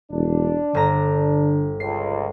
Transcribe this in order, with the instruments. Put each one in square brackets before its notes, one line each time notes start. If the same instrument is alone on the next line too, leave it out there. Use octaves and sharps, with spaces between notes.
[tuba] E1 [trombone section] D4
[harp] G1 A#5 [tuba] D3
[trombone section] C#2 [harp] C7